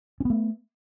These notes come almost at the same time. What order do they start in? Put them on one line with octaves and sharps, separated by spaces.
C#4 B3 A3